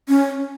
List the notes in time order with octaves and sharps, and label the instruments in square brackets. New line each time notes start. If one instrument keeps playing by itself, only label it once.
[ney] C#4